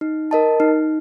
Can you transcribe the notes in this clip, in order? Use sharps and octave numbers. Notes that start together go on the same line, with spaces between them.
D#4
A#4 D#5 A5
D#4